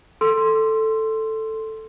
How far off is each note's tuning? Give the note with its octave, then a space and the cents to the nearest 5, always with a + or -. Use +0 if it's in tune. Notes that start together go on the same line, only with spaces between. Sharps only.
A4 +0 C6 +0 E6 +25